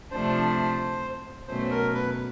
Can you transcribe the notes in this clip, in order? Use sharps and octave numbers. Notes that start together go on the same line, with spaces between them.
C3 F3 A3 D4 C5
B2 F#3 A3 C#4 C5
A#4
B4